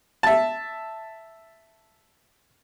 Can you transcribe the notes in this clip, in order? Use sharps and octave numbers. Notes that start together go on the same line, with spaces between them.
E5 A5